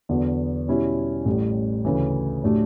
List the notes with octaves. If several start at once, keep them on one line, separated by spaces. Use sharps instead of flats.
E2 D3 F#3 B3 F#4
B2 G3 C#4 E4 G4
A1 A2 G3
D2 C#3 E3
A2 F#3 A3 D4 G4